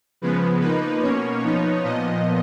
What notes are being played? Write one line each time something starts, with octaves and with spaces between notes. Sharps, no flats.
C#3 F3 G#3 B3 B4
F3 A#3 D#4 B4
B2 A#3 C#4 C#5
F3 B3 D#4
A#2 F3 B3 D#5